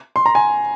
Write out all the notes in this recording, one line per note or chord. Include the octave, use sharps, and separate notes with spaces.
C6
A#5
G#5